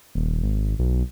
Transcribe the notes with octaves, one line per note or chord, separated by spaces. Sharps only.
D#1
G#1
B1